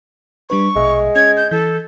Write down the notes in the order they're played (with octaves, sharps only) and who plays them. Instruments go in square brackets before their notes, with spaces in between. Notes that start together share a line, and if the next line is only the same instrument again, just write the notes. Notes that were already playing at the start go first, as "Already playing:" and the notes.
[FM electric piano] G3 D4 B4 [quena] C#6
[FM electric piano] A#1 B2 E5 [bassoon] G#3
[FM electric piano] C#4 [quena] G#6
[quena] G6
[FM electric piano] E3 G6 [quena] A4